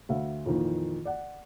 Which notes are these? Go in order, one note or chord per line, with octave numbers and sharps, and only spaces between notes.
D2 E5 F5
F2 A#2 D#3 E3
D5 F#5